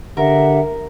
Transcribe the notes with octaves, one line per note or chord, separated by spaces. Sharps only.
D3 G4 A#4 E5 F#5